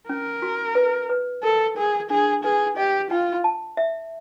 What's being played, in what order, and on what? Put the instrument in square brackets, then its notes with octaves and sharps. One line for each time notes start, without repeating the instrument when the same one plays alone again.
[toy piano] C#4 [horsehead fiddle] A#4
[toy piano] F#4
B4
B4
[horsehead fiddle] A4 [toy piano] A#4
[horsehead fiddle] G#4 [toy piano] A#4
[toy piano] D4 [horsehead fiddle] G#4
[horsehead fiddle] G#4 [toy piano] B4
[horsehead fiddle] G4 [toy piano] D#5
[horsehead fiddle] F4 [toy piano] G5
[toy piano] A5
E5